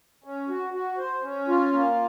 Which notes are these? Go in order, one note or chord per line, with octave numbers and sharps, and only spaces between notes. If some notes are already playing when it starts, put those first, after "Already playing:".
C#4
F#4
F#4
C5
C#4
F4
A#3